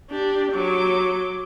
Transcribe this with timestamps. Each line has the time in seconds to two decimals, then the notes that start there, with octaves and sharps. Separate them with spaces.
0.10 D4 G4
0.52 F#3 D6